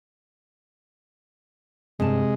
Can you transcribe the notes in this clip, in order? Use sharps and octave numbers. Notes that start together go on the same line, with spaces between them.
G2 C3 G#3 A5